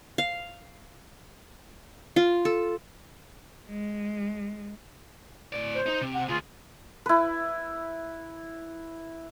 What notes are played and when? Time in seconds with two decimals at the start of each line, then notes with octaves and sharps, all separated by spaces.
0.18 F5
2.16 F4
2.45 A4
3.70 G#3
5.53 A2 D5
5.74 C5
5.86 D#4
6.01 C3
6.14 F#5
6.28 D2 F4 G#4
7.06 E4 B4